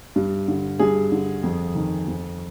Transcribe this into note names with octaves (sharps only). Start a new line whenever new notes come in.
G2
D3
G2 G#4
D3
F2
D#3
F2